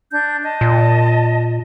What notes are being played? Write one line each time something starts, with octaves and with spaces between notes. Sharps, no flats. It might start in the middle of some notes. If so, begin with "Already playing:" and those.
D4 G6
D#5 A5
A#2